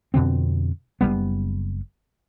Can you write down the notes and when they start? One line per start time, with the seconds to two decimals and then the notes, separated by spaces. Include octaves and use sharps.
0.14 F2 B2 D3 C4
1.01 F#1 G2 G3 B3